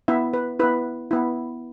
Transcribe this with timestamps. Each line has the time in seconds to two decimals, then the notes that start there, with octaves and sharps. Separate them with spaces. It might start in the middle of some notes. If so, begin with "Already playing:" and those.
0.08 B3 E4 E5
0.34 B4
0.59 B3 E4 B4
1.11 B3 E4